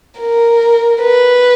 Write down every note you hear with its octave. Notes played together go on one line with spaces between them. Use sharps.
A#4
B4